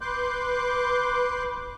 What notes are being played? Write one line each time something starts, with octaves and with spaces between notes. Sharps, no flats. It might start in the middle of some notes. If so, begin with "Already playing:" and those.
B4 C6 D6 F#6 G6